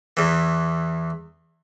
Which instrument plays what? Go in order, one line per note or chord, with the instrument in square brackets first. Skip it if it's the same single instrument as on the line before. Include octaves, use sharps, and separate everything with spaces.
[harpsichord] E2 E3